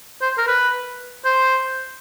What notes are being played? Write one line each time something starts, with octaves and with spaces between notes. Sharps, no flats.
C5
A#4
B4
C5